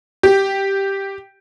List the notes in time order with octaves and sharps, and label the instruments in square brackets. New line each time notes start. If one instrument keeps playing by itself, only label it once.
[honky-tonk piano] G4